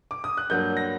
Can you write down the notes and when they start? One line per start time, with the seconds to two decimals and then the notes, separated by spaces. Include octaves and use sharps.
0.11 D6
0.24 D#6
0.37 F#6
0.50 G2 F#3 A#3 G6
0.77 A#6